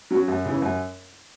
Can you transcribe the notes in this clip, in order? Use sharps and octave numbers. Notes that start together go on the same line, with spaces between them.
F#3 C#4 F#4
F#2
C#3 E3
F#2